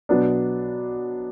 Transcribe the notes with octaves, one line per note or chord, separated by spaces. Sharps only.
B2 F#3 B3 D4